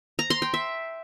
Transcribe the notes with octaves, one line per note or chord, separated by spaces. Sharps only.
A#5
C6
G5
E5